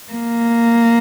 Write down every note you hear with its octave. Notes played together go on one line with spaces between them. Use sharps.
A#3